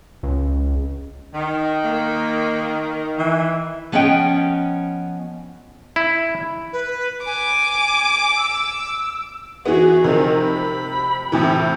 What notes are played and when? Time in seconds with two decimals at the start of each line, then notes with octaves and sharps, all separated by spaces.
0.23 C#2
1.34 D#3
1.84 A#3
3.19 E3
3.92 F3 B3 C#4 D#5 F#5 G5
5.96 E4
6.73 B4
7.26 G#5 D6
8.36 E6
9.66 E3 B3 F#4 G#4
10.04 C3 D#3 F3
10.45 B5
11.32 A2 C3 E3